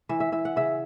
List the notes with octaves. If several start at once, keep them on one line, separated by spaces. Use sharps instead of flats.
E3 E5
E5
E3 E5
F#5
C#3 E5